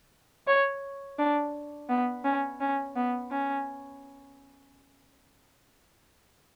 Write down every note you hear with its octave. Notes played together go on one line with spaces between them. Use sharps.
C#5
D4
B3
C#4
C#4
B3
C#4